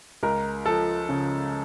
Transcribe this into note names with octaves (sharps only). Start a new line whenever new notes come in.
C#2 A#4
F3 A4
C#3